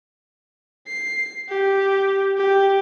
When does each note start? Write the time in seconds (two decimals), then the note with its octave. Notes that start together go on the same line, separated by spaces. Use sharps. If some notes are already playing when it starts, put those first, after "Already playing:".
0.87 C7
1.49 G4
2.38 G4